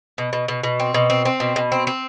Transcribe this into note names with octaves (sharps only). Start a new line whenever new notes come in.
B2
B2
B2
B2
C4
B2
C4
C4
B2
B2
C4
C4